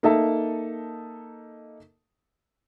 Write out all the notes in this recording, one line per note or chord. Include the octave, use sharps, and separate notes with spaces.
A#3 D#4 A4 D#5 E5 A5